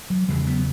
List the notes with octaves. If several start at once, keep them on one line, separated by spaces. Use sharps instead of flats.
F#3
E2 C#3 E3 G#3
F#3 B3